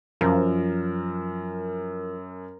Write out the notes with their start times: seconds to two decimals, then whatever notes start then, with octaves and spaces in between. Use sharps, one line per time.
0.21 F#2 F3 A#4